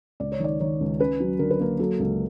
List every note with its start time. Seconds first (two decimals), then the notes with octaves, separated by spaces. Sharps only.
0.20 C#2 D5
0.32 C#5
0.40 D#3 D5
0.60 D#3 C#5
0.81 C#2
0.99 C#4 B4
1.20 F#3
1.39 D3 A#4
1.51 B4
1.60 A#3 A#4
1.79 F#3 A4
1.99 C#2